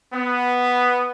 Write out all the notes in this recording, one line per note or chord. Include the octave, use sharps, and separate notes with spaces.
B3